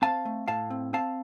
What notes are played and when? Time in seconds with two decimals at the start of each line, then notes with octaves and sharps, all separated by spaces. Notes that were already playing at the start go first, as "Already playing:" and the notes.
0.02 C4 F5 A5
0.25 A3
0.48 A2 F5 A5
0.70 C4
0.93 C4 F5 A5